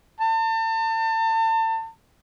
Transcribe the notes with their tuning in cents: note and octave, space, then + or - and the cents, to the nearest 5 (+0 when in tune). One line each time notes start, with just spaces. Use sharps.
A5 +35